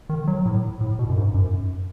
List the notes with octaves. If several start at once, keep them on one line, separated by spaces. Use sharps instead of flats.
D#3
F#3
A2
A2
B2
F#2
G#2
F#2